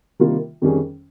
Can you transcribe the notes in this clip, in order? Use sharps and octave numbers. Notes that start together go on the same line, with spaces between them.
C3 D#3 G3 A#3 F4
F2 D#3 G3 C#4 G#4